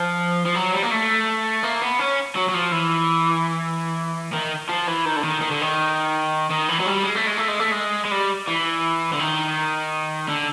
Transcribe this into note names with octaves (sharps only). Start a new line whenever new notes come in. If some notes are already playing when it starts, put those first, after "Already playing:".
Already playing: F3
F3
F#3
G3
A#3
A3
A#3
B3
C#4
F#3
F#3
F3
E3
D#3
F3
E3
D#3
D3
D#3
D#3
D3
D#3
D#3
E3
F#3
G3
G#3
A3
G#3
A3
G#3
A3
G#3
G#3
G3
E3
D3
D#3
D3